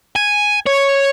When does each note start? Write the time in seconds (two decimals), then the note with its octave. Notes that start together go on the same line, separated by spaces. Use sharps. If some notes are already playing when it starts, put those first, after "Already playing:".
0.16 G#5
0.67 C#5